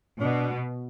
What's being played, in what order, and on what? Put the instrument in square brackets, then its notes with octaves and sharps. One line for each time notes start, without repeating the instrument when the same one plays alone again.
[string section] B2 [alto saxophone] D4